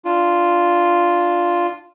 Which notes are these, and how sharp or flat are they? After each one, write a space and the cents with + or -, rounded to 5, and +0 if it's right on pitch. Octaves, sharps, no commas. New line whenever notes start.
D4 +5 F4 +0